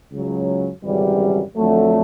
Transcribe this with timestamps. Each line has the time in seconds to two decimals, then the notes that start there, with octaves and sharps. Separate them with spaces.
0.12 C#2 C#3 F#3
0.84 G#1 F#2 C#3 E3 G3
1.56 F2 D3 F#3 A3